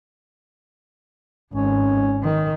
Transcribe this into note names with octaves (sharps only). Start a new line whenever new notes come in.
G#1 C#4
D#3